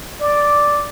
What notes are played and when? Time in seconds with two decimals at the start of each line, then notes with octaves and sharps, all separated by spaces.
0.21 D5